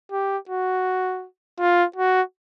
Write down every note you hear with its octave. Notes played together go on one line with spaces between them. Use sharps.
G4
F#4
F4
F#4